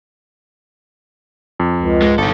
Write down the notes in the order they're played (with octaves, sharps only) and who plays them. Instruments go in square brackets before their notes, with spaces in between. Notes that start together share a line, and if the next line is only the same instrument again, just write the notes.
[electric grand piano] F2
[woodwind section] C#2
[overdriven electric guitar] G#2 G#3
[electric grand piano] G1 [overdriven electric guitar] D#4 A4